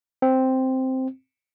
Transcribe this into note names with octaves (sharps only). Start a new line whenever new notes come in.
C4